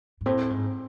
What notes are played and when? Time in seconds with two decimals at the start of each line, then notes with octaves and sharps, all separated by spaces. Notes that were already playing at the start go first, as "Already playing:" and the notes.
0.21 G#2
0.26 A2 C4
0.50 G#2